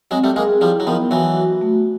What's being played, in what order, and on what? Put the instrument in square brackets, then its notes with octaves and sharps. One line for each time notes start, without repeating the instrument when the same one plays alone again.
[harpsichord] F#3 G#3 [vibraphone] C4
[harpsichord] G3 A3
[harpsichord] G#3 A#3 [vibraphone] G#4
[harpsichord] F3 G3 [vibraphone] E4
[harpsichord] F#3
[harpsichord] D#3 F3 [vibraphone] B3
[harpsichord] E3 F#3 [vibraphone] F#4
[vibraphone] F#4
A3